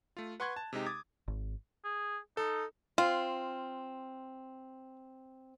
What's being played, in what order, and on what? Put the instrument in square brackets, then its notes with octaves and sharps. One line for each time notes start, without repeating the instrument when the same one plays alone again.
[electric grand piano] A3 F4
B4 F#5 C6 C#6 F#6 G#6
A5
C3 G#3 D#4 G4
D6 D#6 G#6 A6
[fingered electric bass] G#1
[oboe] G#4
[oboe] D#4 [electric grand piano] A4
[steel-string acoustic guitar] C4 [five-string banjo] F4